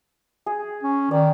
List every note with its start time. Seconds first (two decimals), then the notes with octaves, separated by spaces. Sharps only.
0.46 G#4
0.83 C#4
1.11 D#3 D5